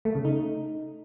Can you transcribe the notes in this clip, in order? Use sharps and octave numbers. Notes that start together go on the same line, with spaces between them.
A3
C#3
D#4